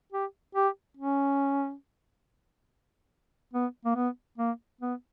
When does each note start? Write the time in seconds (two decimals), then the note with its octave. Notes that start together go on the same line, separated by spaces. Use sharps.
0.12 G4
0.55 G4
0.97 C#4
3.53 B3
3.85 A#3
3.95 B3
4.38 A#3
4.81 B3